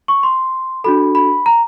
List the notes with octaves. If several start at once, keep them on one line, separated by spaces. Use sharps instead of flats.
C#6
C6
D4 F#4 A4 B5
B5
A#5